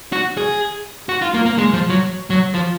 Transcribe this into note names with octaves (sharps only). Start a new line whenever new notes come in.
F#4
G#4
F#4
F4
A#3
A#3
G#3
F3
F#3
F#3
F3